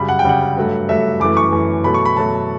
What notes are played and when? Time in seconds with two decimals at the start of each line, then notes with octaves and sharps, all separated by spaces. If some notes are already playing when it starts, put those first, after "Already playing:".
Already playing: F#2 C#3 G3 B5
0.09 F#5
0.19 G5
0.24 F#2 C#3 G3 F#5
0.57 G2 F#3 A3
0.89 G2 F#3 A3 E5
1.20 F#2 E3 A3 D6
1.37 C#6
1.52 F#2 E3 A3
1.84 B2 F#3 A3 B5
1.94 C#6
2.05 B5
2.16 B2 F#3 A3 A5